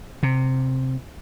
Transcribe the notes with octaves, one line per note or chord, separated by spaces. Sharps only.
C3